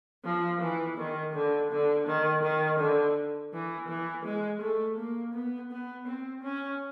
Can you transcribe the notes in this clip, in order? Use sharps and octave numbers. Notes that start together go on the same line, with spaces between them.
F3
E3
D#3
D3
D3
D#3
D#3
D3
E3
E3
G#3
A3
A#3
B3
B3
C4
C#4